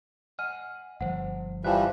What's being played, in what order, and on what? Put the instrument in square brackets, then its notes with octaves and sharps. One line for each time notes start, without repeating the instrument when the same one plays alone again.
[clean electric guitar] D#5 F#5 G#5 [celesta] F6
[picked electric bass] G1 [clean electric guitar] D2 F3 [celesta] C5 F#5
[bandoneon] E3 F3 G3 [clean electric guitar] E5 A5 [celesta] F5 F#6